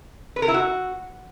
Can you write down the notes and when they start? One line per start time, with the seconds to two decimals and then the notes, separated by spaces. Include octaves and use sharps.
0.36 B4
0.42 A#4
0.48 E4
0.54 F#4